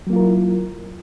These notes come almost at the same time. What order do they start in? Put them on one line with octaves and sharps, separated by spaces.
F#3 A#3 F4 A#4 E4